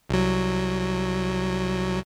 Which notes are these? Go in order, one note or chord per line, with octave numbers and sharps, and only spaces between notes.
C2 F#3